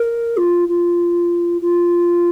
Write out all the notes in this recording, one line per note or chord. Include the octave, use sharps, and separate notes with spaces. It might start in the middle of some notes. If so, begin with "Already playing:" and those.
Already playing: A#4
F4
F4
F4